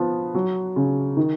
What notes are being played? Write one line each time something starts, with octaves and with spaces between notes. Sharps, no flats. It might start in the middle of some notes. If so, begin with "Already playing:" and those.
Already playing: F3 B3
F#3
C#3
D#3